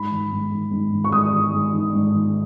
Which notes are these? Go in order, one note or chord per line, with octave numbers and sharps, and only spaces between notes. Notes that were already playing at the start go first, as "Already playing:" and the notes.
Already playing: G#2 B5
D#3
G#2
D#3
G#2
D#3
C#6
G#2 D#6
D#3
G#2
D#3
G#2
D#3